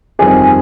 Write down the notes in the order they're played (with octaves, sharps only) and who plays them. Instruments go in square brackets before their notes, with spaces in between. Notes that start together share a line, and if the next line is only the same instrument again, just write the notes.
[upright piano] G1 F2 D#3 G3 C4 [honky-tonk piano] G#4